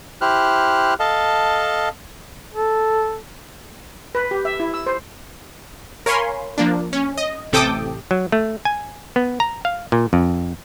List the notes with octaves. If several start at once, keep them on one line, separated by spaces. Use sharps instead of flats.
E4 G4 C5 F6 F#6
A4 D#5 F5 A5
A4
B4
G4
E5
E4
E6
C5
A#4 C#5 F5 G#5 B5 C6
F3 A#3 D4
C#4
D#5
A1 C3 A4 G5 D6 D#6
F#3
A3
G#5
B3
A#5
F5
A#2
F2